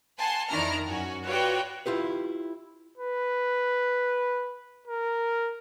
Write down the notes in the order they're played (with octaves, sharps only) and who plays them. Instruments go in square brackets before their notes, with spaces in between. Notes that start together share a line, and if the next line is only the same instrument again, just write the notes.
[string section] F#5 G#5 A5 C6
F2 D#3 D4 E4 A#5 F6
F#2 C#4 F#4
F4 F#4 B4 C#5 D5 G5
[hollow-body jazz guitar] E4 F4 G4 B4
[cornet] B4
A#4